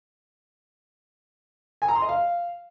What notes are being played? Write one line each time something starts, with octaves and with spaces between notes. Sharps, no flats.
G#5
A#5
C6
D#5
F5